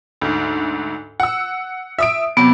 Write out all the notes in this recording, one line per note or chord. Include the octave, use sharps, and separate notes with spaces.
D2 G#2
F#5 E6
E5 D#6 D7
C3 F#3 B3